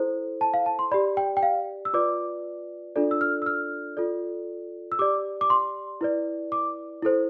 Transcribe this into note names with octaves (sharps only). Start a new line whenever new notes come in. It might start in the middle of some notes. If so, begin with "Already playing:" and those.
Already playing: E4 A4 C5
A5
F5
A5
C6
G4 D5 B5
G5
G5
F5
E6
F4 B4 D5 D6
D4 F4 A4 D5
E6
F6
E6
F6
F4 A4 D5
E6
G4 D5 D6
D6
C6
E4 B4 D5
D6
E4 A4 C5